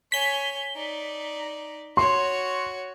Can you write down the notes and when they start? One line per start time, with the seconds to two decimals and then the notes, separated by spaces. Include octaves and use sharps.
0.12 C#5 G#5 B6 G7
0.76 D#4 D5
1.97 F#4 C#5 C6